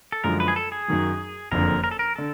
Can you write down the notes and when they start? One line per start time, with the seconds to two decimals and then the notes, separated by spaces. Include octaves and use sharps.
0.12 A4
0.24 F#2 D3 F3 G#3 A#4
0.40 B4
0.48 G#4
0.56 A4
0.72 G#4
0.88 F#2 D#3 F#3
1.52 F#1 F2 D3 A#4
1.84 A#4
1.91 A4
1.99 A#4
2.16 D3 A4